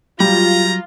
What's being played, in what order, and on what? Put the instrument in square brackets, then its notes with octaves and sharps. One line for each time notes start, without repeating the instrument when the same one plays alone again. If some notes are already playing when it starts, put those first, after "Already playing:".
[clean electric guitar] F#3 [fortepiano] G3 [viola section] F4 [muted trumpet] A#5